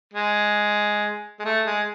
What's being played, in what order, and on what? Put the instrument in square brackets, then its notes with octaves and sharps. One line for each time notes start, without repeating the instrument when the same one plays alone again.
[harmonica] G#3
G#3
A3
G#3